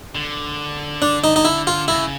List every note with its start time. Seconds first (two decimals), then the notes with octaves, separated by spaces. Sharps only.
0.15 D3
1.02 D4
1.24 D#4
1.36 D#4
1.45 E4
1.67 F4
1.88 C#3 E4